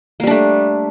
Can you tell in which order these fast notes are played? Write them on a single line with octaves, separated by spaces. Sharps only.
A#3 G3 D4 A3